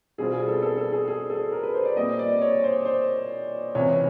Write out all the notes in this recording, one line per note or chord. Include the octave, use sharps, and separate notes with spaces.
B2 G3 C4 F4 G#4
G#4
A4
A4
A4
G#4
G#4
A4
A#4
B4
C5
D5
A#2 G3 C4 D#5
D5
C#5
C5
C5
C#2 C3 E3 C#5